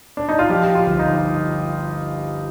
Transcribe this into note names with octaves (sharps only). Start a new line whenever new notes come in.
D4
D#4
F4
F3 G4
F4
G1
D#4